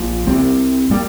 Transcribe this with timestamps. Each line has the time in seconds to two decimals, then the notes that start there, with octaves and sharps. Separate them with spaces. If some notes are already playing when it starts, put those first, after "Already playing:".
Already playing: A#1 A#2 F3
0.26 C2 C3 G3 C4
0.90 C3 G3 A#3